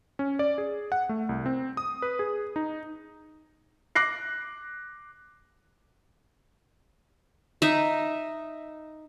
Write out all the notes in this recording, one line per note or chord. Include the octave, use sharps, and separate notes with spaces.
C#4
D5
G#4
F#5
A3
C2
C4
D#6
B4
G#4
D#4
D6 F#6 A#6 C7
D#4 E5